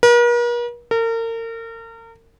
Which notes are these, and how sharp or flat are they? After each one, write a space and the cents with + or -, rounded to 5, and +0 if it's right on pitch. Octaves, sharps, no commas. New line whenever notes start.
A#4 +45
A#4 -35